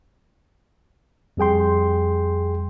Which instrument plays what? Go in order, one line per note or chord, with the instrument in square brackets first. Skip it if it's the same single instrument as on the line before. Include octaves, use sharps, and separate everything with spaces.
[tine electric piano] F2 G3 G#4 G5 C6